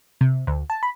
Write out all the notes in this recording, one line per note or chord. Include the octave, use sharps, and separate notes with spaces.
C3
D2
A5
B5